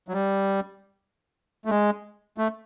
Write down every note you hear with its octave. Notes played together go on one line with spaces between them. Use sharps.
F#3
G3
A3
G#3
A3